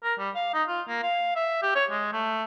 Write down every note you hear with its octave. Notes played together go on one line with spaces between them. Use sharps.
A#4
G3
F5
D#4
F4
A#3
F5
E5
G4
C#5
G#3
A3